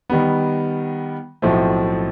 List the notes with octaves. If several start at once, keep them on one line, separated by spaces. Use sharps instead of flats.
D#3 G3 B3
B1 A2 F3 A3 C4